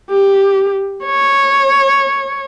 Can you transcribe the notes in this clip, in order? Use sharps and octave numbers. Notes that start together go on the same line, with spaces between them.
G4
C#5